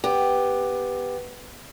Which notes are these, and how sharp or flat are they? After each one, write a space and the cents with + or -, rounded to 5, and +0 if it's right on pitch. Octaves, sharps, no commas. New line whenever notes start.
B3 +0 G4 +10